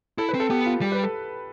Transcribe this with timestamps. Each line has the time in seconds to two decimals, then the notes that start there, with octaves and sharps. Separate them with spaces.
0.18 E4 A4
0.29 B4
0.34 C4
0.40 A4
0.50 B3 G4
0.66 F4
0.81 G3 G4
0.92 B4
1.03 A4